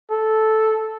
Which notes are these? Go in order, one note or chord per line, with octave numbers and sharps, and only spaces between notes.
A4